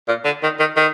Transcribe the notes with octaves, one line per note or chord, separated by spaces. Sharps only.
A#2
D3
D#3
D#3
D#3